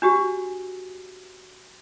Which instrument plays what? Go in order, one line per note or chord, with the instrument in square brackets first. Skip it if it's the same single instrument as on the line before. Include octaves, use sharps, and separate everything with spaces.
[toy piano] D4 F#4 G4